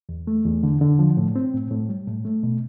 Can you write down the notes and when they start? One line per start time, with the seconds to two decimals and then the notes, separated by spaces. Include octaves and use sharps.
0.09 E2
0.27 A3
0.46 E2
0.63 D3
0.81 D3
0.99 F3
1.17 A2
1.36 C4
1.53 A2
1.71 A2
1.89 G3
2.08 A2
2.25 A3
2.43 B2